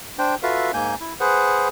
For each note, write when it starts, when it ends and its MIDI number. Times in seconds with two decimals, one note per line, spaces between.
0.19 0.35 62
0.19 0.35 72
0.19 0.35 79
0.43 0.71 65
0.43 0.71 66
0.43 0.71 69
0.43 0.71 71
0.43 0.71 76
0.43 0.71 77
0.74 0.95 44
0.74 0.95 58
0.74 0.95 80
0.74 0.95 91
1.00 1.14 64
1.20 1.68 68
1.20 1.68 71
1.20 1.68 72
1.20 1.68 78